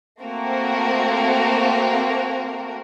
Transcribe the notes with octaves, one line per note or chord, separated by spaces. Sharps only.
A3 A#3 C4 F#4 A#4